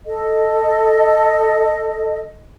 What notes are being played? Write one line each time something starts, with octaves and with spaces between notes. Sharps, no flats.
A4 D#5